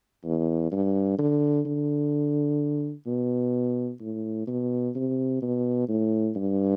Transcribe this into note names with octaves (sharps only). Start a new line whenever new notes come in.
E2
G2
D3
D3
B2
A2
B2
C3
B2
A2
G2